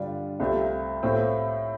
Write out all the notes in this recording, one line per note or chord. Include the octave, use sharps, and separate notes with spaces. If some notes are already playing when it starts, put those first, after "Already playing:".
Already playing: G2 D3 G3 D4 F4
C2 C3 A3 F4
A2 A3 C4 F4